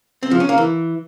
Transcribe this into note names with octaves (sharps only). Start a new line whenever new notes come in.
C4
F3
C#4
A#3
E3